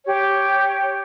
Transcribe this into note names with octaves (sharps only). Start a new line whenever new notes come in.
G4 C#5